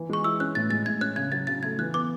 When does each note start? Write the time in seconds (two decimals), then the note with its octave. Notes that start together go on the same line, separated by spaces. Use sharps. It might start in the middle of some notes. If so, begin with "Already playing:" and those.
Already playing: E3
0.09 G#3 C#6
0.24 E4 E6
0.40 C#4 F#6
0.55 A2 A6
0.70 G#3 A6
0.85 A2 G#6
1.01 C#4 F#6
1.16 C#3 G#6
1.32 F#3 A6
1.47 C#3 A6
1.63 A3 G#6
1.79 E3 F#6
1.94 B3 D6